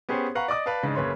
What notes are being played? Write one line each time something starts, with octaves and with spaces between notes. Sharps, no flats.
B3 C#4 G4 G#4 C5
B4 F5 F#5 A#5 C#6
D5 D#5 D6 D#6
B4 D5 F5 A5
G#2 C#3 D4 D#4
F#1 C#3 B4 C#5 C6